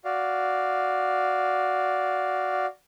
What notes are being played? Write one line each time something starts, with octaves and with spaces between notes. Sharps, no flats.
F#4 D5 F5